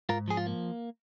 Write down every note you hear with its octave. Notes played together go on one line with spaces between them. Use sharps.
G#2 F4 A#4
F3 G#4
F4
A#3